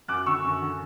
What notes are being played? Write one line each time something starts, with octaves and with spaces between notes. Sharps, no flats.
F#2 D6 F#6
D3 C#6 E6
F#2
D3